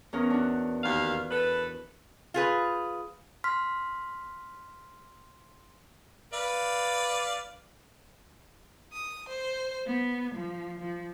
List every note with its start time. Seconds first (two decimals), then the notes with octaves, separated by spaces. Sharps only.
0.13 E2 C#4 A#4
0.30 D4 F#4
0.84 D#2 F5
1.30 A4 B4
2.34 F4 G#4 B4
3.44 C6 F6 B6
6.33 B4 D5 F5
8.92 D#6
9.29 C5
9.86 B3
10.35 F3
10.79 F3